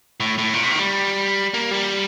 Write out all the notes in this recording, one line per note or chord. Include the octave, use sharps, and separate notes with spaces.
A2
A2
A#2
C3
D#3
G3
A#3
G3